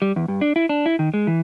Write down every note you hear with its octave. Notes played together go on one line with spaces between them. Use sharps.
G3
E2
G2
D4
E4
D4
E4
D#3
G#3
E3